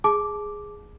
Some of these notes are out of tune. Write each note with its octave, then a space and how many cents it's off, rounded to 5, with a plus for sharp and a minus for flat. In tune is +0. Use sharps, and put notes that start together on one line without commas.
G#4 +0 A5 -25 D6 +0